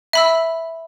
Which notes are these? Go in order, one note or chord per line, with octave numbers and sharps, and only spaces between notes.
E5 B5 E6